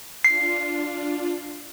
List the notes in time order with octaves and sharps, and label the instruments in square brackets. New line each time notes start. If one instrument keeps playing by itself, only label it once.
[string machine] D4 F4 [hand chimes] C7